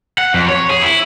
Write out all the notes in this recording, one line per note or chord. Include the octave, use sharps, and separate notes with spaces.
F#5
F2
C#5
G#4
E4